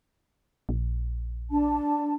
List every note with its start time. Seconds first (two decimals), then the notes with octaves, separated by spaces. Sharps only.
0.69 A#1
1.51 D4 A5